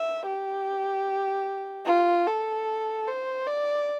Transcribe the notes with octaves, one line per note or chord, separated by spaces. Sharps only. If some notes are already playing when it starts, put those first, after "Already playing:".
Already playing: E5
G4
F4
A4
C5
D5